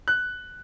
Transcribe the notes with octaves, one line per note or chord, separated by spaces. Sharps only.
F#6